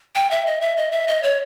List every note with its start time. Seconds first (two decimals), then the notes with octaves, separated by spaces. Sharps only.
0.15 G5
0.31 E5
0.47 D#5
0.61 E5
0.77 D#5
0.92 E5
1.08 D#5
1.23 C#5